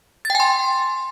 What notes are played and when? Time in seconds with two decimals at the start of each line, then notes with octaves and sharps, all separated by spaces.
0.25 A6
0.30 G5
0.35 G#5
0.40 C6